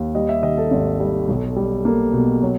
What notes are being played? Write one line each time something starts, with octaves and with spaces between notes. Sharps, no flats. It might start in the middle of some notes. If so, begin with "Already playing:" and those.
Already playing: D#2
G3 D#5
E5
D#3 D#5
A4
G#1
G3
B1
G3
A#3 A4
B2
F#3